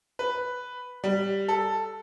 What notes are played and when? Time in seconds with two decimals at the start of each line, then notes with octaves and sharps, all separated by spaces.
0.19 B4
1.04 G3
1.48 A4